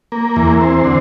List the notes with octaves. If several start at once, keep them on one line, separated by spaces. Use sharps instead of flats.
A#3
E2
C4
D3